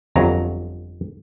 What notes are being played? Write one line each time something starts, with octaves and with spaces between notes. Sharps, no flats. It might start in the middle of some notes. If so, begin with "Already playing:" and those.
G1 F2 F#3 A#5